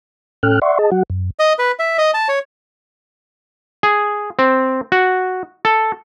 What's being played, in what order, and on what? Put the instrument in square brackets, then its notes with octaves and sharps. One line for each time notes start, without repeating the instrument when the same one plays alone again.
[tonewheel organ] A2 C#4 A4 G5 F6 F#6
D5 E5 F#5 C6 C#6
G#4 D#5 A5
F#3 F#4 F#5
F#2
[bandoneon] D#5
B4
E5
D#5
A5
C#5
[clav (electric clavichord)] G#4
C4
F#4
A4